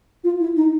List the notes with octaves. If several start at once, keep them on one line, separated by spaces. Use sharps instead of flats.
F4
E4
D#4